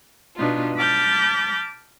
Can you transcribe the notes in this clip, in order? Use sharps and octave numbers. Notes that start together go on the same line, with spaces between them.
B2 B3 D4 D#4 F4
A5 B5 D6 F6 G6 A6